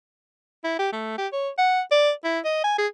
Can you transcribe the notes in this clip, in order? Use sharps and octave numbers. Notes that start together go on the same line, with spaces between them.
E4
G4
A3
G4
C#5
F#5
D5
E4
D#5
G#5
G#4